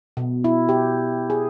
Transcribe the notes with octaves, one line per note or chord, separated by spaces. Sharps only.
B2
E4
G4
G#4